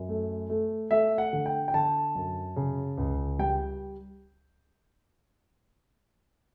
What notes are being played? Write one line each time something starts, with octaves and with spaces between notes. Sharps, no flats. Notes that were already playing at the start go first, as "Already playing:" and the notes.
Already playing: F#2
A3
A3
A3 E5
F#5
D3
G5
G5
D3 A5
F#2
C#3
C#2
G3 G5